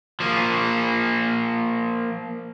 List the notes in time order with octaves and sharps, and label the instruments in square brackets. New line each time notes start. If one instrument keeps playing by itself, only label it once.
[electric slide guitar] F3 A#3